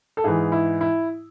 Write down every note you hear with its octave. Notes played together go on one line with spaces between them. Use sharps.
A4
G#2 E3 G#4
E4
E4